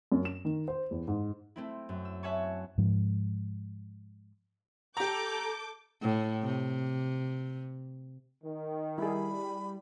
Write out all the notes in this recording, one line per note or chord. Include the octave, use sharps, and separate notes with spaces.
F#2
E7
D#3
C5
E2
G#2
A3 C4 E4
F#2
E6
C#5 E5 F#5 G#5 A5 C#6
G#2 F3
G4 A4 A#5 D6 G6
A2
C3
D#3
G3 E4 G#4 B5